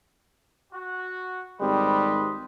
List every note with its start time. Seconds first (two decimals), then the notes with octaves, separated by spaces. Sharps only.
0.73 F#4
1.61 G#1 G3 B4 C5 D#5